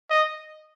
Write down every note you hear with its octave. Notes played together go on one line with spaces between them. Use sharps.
D#5